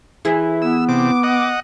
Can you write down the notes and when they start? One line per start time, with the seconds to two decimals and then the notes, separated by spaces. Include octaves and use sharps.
0.25 E3 E4 G#4
0.62 B3 E6
0.88 C3 D6
1.23 D#5 F#5